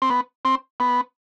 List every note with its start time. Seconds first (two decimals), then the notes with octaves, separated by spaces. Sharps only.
0.02 C4
0.10 B3
0.45 C4
0.80 B3